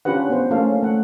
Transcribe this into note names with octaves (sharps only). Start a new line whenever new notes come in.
C#4 D4 F4 G4 B4 F#5
B3 C5
A3 A#3 C#4 F4 A4 F5
A3 F#5